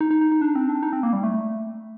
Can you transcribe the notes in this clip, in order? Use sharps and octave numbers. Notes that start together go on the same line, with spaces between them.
D#4
D#4
D#4
D#4
D4
C4
D4
D#4
C4
A#3
G3
A3